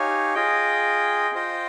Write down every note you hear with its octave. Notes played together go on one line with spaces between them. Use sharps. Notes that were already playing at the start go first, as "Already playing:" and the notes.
Already playing: D#4 G4 C#5 F5 G#5
F4 G#4 D#5 G5
F4 C5 D#5 G5